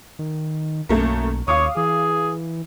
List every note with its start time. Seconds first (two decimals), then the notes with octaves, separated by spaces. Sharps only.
0.19 D#3
0.89 B1 F#2 A3 A#3
1.48 D#2 C#5 F5 D6 D#6
1.77 E3 G#4